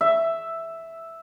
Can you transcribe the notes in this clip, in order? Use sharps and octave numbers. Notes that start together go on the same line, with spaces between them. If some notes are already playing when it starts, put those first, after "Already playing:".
E5